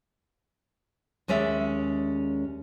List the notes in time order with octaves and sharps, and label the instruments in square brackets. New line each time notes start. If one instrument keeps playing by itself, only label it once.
[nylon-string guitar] D#2 G#3 C#4 D5 E5